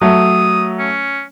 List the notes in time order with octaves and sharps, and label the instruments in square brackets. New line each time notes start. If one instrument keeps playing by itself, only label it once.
[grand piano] F#3 A3 [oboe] D#6
[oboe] C#4